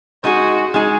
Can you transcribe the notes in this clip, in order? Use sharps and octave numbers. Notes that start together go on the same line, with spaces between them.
G#3 D#4 F#4 G#4
G#3 D#4 G#4